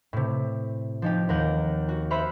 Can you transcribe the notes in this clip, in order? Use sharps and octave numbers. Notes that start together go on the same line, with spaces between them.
A2 C3
F3 D#4 G4
D#2 A#4 F#5 G6
F#4
C5 E5 B5 F6 F#6 C#7